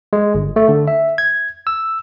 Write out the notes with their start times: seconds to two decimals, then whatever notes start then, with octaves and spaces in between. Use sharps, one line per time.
0.13 G#3
0.35 G1
0.56 A3
0.69 D3
0.88 E5
1.18 G#6
1.67 E6